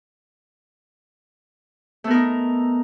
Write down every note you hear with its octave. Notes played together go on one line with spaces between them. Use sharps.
A3 B3 D#4 A#4